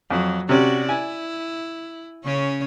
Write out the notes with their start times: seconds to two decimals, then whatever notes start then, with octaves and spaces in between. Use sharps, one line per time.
0.11 F2 F#3
0.49 C3 C#4 F#4 D5
0.89 E4 G#5
2.25 C#3 C#4 C#5